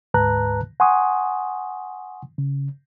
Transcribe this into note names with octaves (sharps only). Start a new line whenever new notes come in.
D2 G#2 B4 A5 A#5 F#6
F#5 G#5 C6 C#6 D#6
C#3